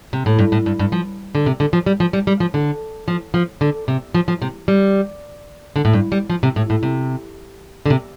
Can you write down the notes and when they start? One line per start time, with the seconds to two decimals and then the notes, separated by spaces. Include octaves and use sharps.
0.13 C3
0.26 A2
0.39 G2
0.52 A2
0.66 G2
0.79 G2
0.92 F3
1.35 D3
1.46 C3
1.60 D3
1.73 F3
1.86 G3
2.00 F3
2.13 G3
2.27 G3
2.40 F3
2.54 D3
3.08 F3
3.34 F3
3.61 D3
3.88 C3
4.14 F3
4.28 F3
4.42 C3
4.68 G3
5.76 D3
5.85 A2
5.93 G2
6.12 G3
6.30 F3
6.43 C3
6.56 A2
6.70 A2
6.83 C3
7.86 D3
7.90 C3